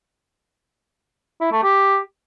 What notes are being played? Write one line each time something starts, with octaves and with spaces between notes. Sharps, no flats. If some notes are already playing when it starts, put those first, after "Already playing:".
E4
A3
G4